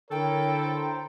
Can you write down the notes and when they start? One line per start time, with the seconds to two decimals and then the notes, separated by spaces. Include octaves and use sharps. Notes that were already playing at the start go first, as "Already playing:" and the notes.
0.11 D3 E4 A4 A#4 C#5 G5
0.63 C5 A#5